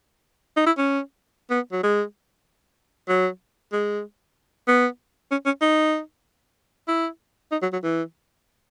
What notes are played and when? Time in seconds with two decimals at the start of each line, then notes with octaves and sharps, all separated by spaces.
0.57 D#4
0.66 E4
0.78 C#4
1.50 B3
1.72 F#3
1.83 G#3
3.09 F#3
3.73 G#3
4.68 B3
5.31 C#4
5.46 C#4
5.62 D#4
6.88 E4
7.52 D#4
7.62 F#3
7.73 F#3
7.83 E3